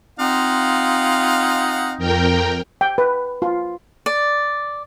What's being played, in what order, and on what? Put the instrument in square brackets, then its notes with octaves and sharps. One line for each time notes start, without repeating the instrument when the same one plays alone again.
[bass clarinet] C4 [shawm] D#4 [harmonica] F4 F5 F#5
[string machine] F2 A#4 G5
[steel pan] G5
B4
F4
[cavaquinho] D5